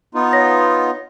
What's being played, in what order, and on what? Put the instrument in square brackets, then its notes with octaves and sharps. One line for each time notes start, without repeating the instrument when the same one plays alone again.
[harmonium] B3 D#4 F4
[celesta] C#5 A#6